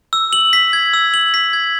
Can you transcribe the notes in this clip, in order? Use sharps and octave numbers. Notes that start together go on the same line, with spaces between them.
E6
F#7
B6
G#6
E6
F#7
B6
G#6